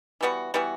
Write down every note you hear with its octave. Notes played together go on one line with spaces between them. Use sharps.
E3 G3 B3 F#4
E3 G3 B3 F#4